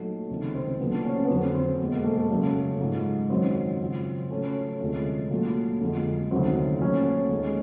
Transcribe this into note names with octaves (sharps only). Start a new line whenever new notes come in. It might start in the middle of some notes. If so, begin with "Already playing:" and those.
Already playing: A#2 F#3 A3 D#4
C#2 C3 D#3
C4
A#2 F#3 A3 B3
D4
C#4
C4
B3
F2 D3 F#3 C4
C4
E2 B2 G#3
A#3
A3
A3
F#2 C#3 F#3 A3
G#2 F3 G#3
F#2 D#3 F#3 C4
F#2 C#3 F3
A2 F#3 A3 C#4
D2 C3 F3 G#3
A#2 F#3 A3
F2 D3 F3 G#3
D2 C3 D#3 F#3 C4
A#2 F#3 A3 C#4
C#4
D#2 D#3 G#3